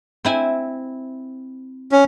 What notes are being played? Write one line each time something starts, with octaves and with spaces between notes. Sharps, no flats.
C4 E4 G#5
C#4